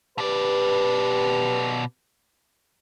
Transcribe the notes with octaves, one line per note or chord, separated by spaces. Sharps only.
B2 G4 B4 D5